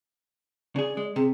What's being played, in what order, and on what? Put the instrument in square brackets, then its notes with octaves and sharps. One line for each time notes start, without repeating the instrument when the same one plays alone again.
[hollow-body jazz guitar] C#3 G#4 [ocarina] D5
[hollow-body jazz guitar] G#3
[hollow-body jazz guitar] C3 [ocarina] G#4